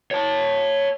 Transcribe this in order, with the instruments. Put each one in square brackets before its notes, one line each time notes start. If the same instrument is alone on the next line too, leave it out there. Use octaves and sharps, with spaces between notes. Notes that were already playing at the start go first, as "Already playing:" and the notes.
[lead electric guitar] C#5 A5